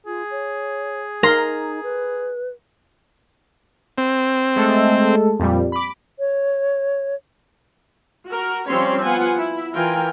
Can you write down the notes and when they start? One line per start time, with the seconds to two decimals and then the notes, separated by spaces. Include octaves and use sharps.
0.06 F4 G#4
0.30 C#5
1.23 D#4 A#4 A#5 C6
1.83 B4
3.98 C4
4.56 G#3 A3 A4
5.40 F2 A#2 G3
5.72 B5 D6
6.19 C#5
8.27 F#4 A#4
8.67 F3 G3 C4 C#4 C#5 C6
9.02 B3 F4 F#5 G#5
9.37 E4
9.72 E3 F4 A#4 G5 G#5